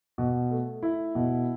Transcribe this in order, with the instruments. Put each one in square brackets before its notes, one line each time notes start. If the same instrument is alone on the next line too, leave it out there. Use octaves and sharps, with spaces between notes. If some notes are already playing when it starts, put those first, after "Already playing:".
[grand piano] B2
A3
E4
B2